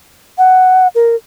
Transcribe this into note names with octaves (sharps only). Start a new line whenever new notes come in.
F#5
A#4